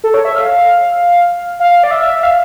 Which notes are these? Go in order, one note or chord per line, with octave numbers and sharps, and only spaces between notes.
A4
C#5
E5
F5
F5
D5
E5
E5
F5